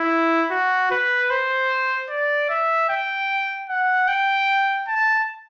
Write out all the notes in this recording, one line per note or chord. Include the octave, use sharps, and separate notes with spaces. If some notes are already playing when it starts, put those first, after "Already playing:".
Already playing: E4
F#4
B4
C5
D5
E5
G5
F#5
G5
A5